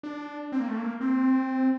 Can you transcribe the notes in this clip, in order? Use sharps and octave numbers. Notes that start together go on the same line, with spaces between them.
D4
C4
A#3
A3
A#3
C4